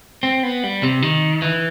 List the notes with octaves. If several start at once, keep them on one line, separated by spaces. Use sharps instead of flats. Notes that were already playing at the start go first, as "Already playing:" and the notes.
C4
B3
G3
C3
D#3
E3